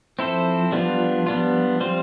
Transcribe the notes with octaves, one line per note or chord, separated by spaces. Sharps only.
F3 C4 E4 A4 C5
G3 B3 D4 F4
F3 G3 B3 D4 F4
G3 C4 F4 C5